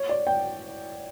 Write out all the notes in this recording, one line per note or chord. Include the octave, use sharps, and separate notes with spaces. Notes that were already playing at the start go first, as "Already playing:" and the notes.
Already playing: C#5
D5
G5